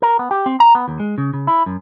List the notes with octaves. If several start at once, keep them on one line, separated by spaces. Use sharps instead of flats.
A#4
B3
G4
C4
A#5
B3
D#2
G#3
C#3
C#3
E4
F#2